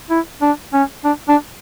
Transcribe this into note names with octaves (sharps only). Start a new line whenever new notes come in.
E4
D4
C#4
D4
D4